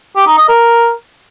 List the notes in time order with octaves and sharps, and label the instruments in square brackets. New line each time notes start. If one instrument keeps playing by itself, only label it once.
[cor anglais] G4
D#4
D#5
A#4